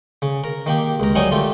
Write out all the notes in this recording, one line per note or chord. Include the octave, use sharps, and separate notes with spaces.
C#3
A#4
D#3 A#3 G4
C#2 A#4
F#3 G3 D#4 A#4 C#5 G#5
A3 F4 G4